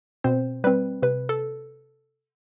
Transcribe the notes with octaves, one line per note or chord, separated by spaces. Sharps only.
B2 C4 C5
G3 C4 B4
C3 B4
A4